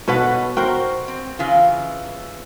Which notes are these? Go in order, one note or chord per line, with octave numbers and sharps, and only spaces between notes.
B2 A4 B4 C#5 D#5 F#5
F#4 A#4 C5 G5
C4
C#3 E3 F4